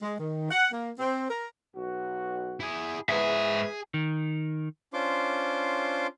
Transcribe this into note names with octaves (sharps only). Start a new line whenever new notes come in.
G#3
D#3
F#5
A#3
C4
A#4
B1 F#4
E4 G#4
E2 G#2 E3 G#4 B4 E5
D#3
C#4 D4 F4 C5 C6 D6